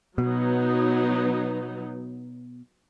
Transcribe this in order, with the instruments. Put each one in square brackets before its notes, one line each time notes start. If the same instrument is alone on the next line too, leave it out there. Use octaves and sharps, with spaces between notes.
[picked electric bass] B2 [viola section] F#3 B3 D#4